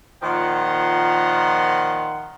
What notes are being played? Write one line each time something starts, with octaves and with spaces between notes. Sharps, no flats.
A#2 D#3 F3 F#5 C6